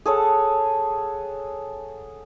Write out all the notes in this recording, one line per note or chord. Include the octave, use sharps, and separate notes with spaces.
G#4 A4 C#5 F#5